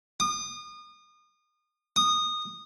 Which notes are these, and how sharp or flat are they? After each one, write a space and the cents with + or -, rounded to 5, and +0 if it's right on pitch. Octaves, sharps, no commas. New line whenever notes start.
D#6 -35
D#6 -15